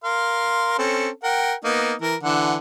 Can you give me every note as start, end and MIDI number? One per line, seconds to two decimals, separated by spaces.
0.04 0.77 70
0.04 0.77 77
0.04 0.77 84
0.78 1.09 60
0.78 1.09 61
0.78 1.09 69
1.23 1.54 70
1.23 1.54 78
1.23 1.54 79
1.65 1.93 58
1.65 1.93 59
1.65 1.93 63
2.01 2.15 52
2.01 2.15 70
2.23 2.57 50
2.23 2.57 52
2.23 2.57 78